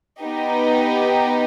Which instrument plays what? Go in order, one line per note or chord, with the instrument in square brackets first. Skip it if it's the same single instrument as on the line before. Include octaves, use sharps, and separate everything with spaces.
[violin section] B3 D#4 G4